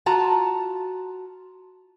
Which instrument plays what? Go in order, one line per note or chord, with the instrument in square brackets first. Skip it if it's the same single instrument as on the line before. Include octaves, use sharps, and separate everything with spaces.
[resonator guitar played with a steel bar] F4 F#4 A5 A#5